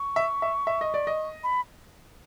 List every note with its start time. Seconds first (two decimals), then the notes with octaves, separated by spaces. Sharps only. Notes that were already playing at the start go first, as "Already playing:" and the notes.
Already playing: C#6
0.16 E5
0.42 E5
0.67 E5
0.81 D#5
0.94 D5
1.07 D#5
1.43 B5